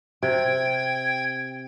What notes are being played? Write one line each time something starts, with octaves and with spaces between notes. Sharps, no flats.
C3 G5 G#6